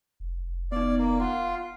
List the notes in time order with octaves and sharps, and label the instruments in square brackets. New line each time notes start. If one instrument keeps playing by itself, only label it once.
[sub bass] F1
[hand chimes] B3 D#4 [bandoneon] D5
[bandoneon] A#3
[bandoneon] F4 [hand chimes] F#5